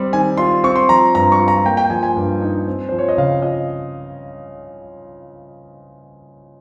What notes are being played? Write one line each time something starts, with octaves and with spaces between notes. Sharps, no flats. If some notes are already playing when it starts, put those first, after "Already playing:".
Already playing: G3 C4
D#3 G#5
F4 C6
C4 C#6
C6
F3 A#5
G2 A#5
C#6
F4
A#5
A#3 G5
G5
F3 G#5
G#5
G2
D#4
C4
F3 C5
C#5
D#5
C#3 F5
F4 D#5